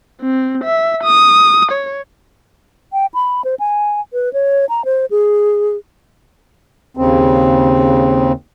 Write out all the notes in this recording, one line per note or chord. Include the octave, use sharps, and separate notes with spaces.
C4
E5
D#6
C#5
G5
B5
C5
G#5
B4
C#5
A#5
C5
G#4
D#2 C#3 C4